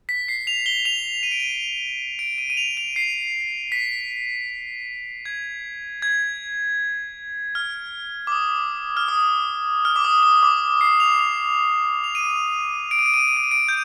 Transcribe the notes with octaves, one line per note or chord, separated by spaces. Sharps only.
B6
C7
F7
G7
F7
D#7
D7
D#7
D7
D#7
D#7
F7
F7
C7
B6
G#6
G#6
F6
D6
D#6
F6
D#6
F6
D6
D#6
D#6
D6
C7
F7
F7
F7
D#7
D7
D#7
D7
D#7
D7
D#7
D7
D#7
D7
G6